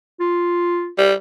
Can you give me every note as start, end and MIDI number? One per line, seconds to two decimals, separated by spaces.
0.20 0.90 65
0.98 1.14 55